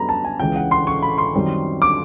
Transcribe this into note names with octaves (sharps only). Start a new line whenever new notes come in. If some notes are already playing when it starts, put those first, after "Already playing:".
Already playing: F#2 D3 G3 B3 A#5 B5
A5
G#5
C#2 C#3 E3 G5
F#5
C6
C#6
B5
C6
F#2 D#3 G3 C4
D6